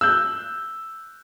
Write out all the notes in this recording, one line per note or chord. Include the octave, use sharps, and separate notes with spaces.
E6 F#6 G6